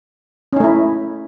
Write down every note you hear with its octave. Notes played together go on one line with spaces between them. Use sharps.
A3 C#4 D#4 E4